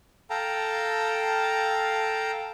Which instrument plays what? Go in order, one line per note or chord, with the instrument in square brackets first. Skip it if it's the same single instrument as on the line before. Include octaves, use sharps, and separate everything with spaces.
[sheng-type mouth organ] A4 F5 G5 A5 A#5